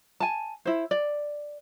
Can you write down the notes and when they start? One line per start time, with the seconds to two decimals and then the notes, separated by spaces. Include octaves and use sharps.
0.20 G#5 A5
0.65 E4 C5
0.91 D5